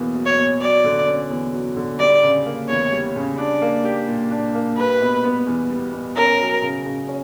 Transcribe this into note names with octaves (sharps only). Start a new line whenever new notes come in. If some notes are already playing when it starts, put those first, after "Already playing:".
Already playing: E2 B2 F#3 A#3
F#3
C#5
B2
F#3 D5
D3
C#4
E2
F#3
D3
G3 D5
C#3
A#3
E2 C#5
G3
C#3
D4 D5
A#3
G4
A#2
D4
A#3
G3 B4
B2
B3
E2
G3
B2
C#4 A#4
F#3
C#3
C#3
C#4